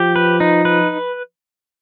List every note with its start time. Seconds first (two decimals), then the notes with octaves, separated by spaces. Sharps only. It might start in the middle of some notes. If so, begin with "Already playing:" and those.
Already playing: F3 G4
0.16 B4
0.40 D#4
0.65 B4